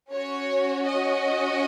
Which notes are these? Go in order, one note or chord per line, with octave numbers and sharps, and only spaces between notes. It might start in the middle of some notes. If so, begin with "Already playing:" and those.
C#4 F#4 C#5
D#5